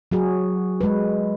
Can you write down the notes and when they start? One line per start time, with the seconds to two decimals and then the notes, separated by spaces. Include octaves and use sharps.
0.12 F#3 F#4 G#4
0.81 G#3 B4